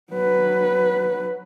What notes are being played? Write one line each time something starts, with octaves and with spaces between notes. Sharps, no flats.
F#3 B4